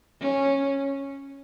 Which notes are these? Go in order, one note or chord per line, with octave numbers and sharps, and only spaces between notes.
C#4